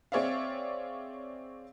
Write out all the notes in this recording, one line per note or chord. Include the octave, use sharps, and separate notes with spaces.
C4 G#4 C#5 D5 E5 F5